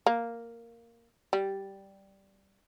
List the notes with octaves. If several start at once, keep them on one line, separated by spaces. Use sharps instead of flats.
A#3
G3